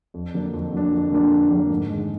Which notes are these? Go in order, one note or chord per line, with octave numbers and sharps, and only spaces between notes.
F2
D3 F#3 A#3 D4
F2
D3 F#3 A#3 D4
F2
D3 F#3 A#3 D4
F2
D3 F#3 A#3 D4
G#2
D#3 G#3